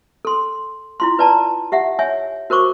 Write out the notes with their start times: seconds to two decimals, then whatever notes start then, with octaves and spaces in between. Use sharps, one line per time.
0.25 A4 C6
1.00 E4 F4 C6
1.19 B4 D5 A5 A#5
1.72 G4 E5 F#5
1.99 C#5 E5 G#5
2.50 F#4 A#4 C5 C#6 D6